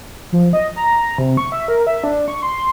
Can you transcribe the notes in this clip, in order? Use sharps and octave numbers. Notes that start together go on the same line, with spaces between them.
F3
D#5
A#5
C3
C#6
E5
A#4
E5
D4
C#6
C6